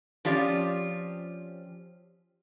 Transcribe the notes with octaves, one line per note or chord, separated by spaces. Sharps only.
F3 C4 C#4 F4 G4 D5